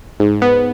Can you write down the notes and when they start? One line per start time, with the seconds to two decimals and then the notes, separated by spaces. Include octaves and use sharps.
0.20 G#2
0.42 B3